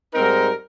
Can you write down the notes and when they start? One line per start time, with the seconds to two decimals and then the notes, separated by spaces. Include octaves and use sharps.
0.14 G#2 G3 C4 D#4 A#4